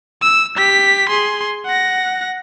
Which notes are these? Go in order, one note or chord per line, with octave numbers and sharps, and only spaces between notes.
E6
G4 B6
G#4 C6
F#5 A#6